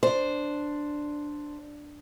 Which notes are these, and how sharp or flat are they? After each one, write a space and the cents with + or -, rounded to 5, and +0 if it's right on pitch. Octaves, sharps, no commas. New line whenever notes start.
D4 +0 C5 +0